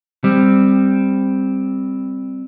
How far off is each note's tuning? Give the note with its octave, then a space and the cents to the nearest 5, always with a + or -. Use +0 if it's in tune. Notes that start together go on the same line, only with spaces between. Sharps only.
G3 +15 C4 +0